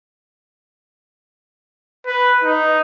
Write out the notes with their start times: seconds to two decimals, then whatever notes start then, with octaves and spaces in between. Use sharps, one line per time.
2.06 B4
2.44 D#4